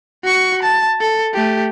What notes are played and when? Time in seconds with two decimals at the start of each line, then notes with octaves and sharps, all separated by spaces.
0.24 F#4 C#6
0.63 A5
1.01 A4
1.34 A3 G4